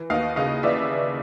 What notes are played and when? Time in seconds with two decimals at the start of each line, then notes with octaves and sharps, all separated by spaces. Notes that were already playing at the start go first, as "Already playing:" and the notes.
Already playing: E3
0.10 D#2 D#5 F5
0.36 C#3 D#5 F5
0.63 E3 D5 E5